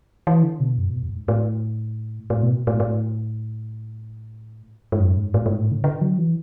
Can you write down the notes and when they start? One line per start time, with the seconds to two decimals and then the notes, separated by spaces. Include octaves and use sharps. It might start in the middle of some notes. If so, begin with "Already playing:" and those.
0.27 E3
0.43 D3
0.60 B2
0.78 F#2
0.90 B2
1.03 E2
1.11 A2
1.16 G#2
1.28 A2
2.30 A2
2.43 B2
2.67 A2
2.80 A2
4.92 G#2
4.99 F#2
5.17 G#2
5.34 A2
5.46 G#2
5.60 A2
5.71 D3
5.84 D3
6.01 F#3
6.18 E3